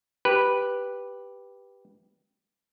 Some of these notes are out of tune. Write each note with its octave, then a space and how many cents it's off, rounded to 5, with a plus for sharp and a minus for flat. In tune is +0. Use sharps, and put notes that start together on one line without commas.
G4 +0 B4 -5